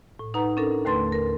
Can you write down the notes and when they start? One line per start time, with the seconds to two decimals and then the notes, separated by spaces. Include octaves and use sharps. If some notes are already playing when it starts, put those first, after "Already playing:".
0.19 A2
0.34 D#4 B4 F#5 A#5
0.57 C#4 D4 A4 A#4
0.85 D#2 D3 A3 B4 C6 A6
1.12 A#4